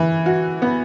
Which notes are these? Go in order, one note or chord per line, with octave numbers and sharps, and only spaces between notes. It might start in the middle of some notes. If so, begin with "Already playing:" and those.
Already playing: E3
F#4
B3